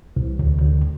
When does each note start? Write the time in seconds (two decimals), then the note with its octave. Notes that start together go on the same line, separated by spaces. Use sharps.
0.16 C2
0.39 D2
0.62 D2